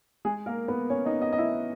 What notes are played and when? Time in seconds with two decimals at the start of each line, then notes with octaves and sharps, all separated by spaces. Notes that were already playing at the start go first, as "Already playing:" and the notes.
0.25 G#3 G#4
0.46 A#3 A#4
0.68 B3 B4
0.90 C#4 C#5
1.05 D#4 D#5
1.21 D#4 D#5
1.33 D#5
1.38 E4 E5